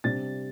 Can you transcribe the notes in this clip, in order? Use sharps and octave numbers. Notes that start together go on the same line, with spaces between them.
C3 G3 D4 A6